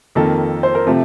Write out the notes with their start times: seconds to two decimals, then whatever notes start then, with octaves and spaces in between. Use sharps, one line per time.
0.15 F2 D#3 A#3 A4
0.63 C5
0.75 A#4
0.87 C3 F3 A3 A4